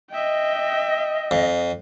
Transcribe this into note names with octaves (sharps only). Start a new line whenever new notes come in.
D#5 E5 G5
F2